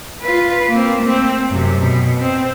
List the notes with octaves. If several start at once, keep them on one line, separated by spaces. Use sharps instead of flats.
F4 B4
A#3 C4
A3 C4
F#2 C3
B2
C4